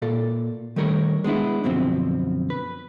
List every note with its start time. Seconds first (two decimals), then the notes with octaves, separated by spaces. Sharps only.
0.02 A#2 A#3 A4
0.76 D#3 G3 A3 A#4 C#5
1.24 G#3 B3 D4 E4
1.64 F#2 B2 D3 F3 C4
2.50 B4